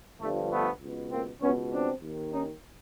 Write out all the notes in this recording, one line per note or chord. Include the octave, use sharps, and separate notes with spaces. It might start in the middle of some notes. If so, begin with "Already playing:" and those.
G1 G2 D3 F3 A3
A3 B3
C#2 B2
A#3 C4
C#2 B2 B3 C#4
C4 D4
D#2 D#3
C#4 D#4